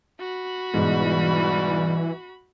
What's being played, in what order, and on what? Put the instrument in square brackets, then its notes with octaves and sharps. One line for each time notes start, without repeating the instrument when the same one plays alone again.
[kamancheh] F#4 B5
[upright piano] G#2 B2 [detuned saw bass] E3 [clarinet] G3